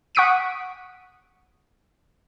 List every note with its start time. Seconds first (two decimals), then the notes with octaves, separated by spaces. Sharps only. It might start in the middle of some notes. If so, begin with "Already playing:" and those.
0.15 F#5 C#6 D#6 B6 D7 D#7